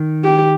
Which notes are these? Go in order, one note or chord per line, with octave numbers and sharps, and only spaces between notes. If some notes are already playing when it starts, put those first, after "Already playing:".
Already playing: D#3
G4